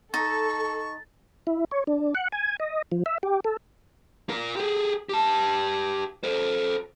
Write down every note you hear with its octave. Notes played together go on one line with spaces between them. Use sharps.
D#4 A4 C#6 A6
E4
C#5
D4
F#5
G#5
D#5
F3
E5
G4
A4
F4 A#4
G4 G#4
G4 A5
A4 C5